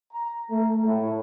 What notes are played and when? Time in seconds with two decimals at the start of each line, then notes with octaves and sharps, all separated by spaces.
0.13 A#5
0.51 A3
0.86 A2